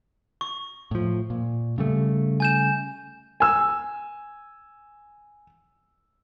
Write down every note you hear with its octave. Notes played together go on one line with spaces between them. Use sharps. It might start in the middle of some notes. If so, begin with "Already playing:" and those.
C#6
A2 F3
A#2
C#3 G3 A3
G#5 G6 E7
G#5 E6